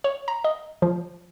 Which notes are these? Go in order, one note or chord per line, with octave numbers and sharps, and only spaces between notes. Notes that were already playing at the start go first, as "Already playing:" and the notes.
C#5
A#5
D#5
F3